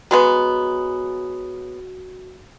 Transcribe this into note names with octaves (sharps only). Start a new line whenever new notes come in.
F#3 G#3 B3 F#4